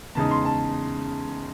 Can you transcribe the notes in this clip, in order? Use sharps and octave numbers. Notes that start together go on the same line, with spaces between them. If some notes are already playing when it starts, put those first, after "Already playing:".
E2 C#3 G#3 D#4 A5
C6
A5